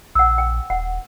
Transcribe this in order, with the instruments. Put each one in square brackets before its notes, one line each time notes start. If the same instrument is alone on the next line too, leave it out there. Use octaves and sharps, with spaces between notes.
[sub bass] A#1 [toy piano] F#5 E6
[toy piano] G5
[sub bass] D#1 [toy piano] F#5